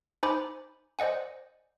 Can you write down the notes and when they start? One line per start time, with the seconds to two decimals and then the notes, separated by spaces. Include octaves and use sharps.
0.23 D#4 C5 G#5 A#5 B5 D6
0.99 C5 D5 D#5 F#5 G#5